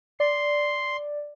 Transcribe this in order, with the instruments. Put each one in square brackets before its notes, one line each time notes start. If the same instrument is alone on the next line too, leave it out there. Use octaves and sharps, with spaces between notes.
[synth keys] D5 [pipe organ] C6